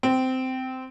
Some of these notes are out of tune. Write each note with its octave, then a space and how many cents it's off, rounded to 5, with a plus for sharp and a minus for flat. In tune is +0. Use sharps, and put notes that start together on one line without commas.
C4 -15